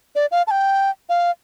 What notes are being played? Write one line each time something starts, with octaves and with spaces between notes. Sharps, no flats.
D5
F5
A5
G5
F5